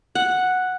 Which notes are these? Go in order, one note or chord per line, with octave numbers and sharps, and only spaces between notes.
F#5